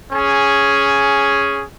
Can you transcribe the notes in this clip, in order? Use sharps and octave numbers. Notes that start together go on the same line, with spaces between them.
C#4 G#4